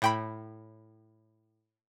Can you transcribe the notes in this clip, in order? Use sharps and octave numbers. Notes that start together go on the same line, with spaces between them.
A2 G5 B5